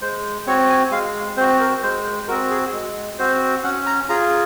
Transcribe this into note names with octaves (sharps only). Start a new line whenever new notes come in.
G#3 C5
C4 F#4 C#5
G#5
G#3 F5
C4 F#4 C5
A#4
G#3 C5
C4 F#4 A#4
G#4
G#3
C4 F#4 C5
C#4 F#5
A#5
F4 G#4 A#5